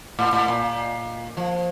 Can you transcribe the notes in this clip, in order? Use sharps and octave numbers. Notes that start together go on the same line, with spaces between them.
A2
A2
A#2
F3